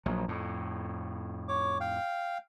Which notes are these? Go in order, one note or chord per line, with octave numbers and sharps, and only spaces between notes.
A#1 F#3
F2 A2
C#5 D6
F5 G5